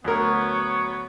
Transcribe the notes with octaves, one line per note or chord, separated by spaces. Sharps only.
D2 F#3 B3 A#4 C#5